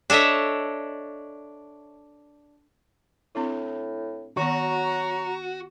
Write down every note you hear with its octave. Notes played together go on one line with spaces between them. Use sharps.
D4 A4 C#5 D#5 E5
A2 C4 D4 E4
D#3 F#3 B3 F#4 A#5